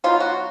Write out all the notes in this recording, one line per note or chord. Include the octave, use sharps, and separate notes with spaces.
F#3 B3 D#4 F4
F#4